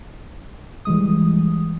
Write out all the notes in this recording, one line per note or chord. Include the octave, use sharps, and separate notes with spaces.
E3 G3 G#3 D#6